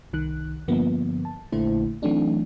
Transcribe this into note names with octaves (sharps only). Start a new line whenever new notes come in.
C2 D#3 F#6
G2 D3 F3 A#3 B3
A5
A#1 A#2 D3 A3 E4 C5
E3 F#3 A3 C4 D4 D#4